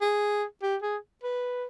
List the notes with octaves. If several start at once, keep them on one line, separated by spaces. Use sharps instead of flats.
G#4
G4
G#4
B4